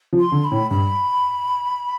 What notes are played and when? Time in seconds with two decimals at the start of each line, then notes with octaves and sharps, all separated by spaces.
0.13 F3
0.20 C6
0.32 D3
0.44 B5
0.52 A2
0.70 G2 B5